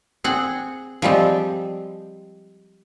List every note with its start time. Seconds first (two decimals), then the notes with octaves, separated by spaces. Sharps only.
0.24 C4 G#4 F#5
1.02 F3 G3 G#3 C4